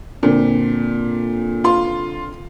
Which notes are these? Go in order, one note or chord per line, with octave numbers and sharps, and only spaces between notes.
A#2 D3 C4 A4
F4 C6